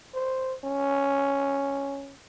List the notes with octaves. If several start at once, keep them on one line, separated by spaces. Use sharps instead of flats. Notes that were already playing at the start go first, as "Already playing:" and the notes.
C5
C#4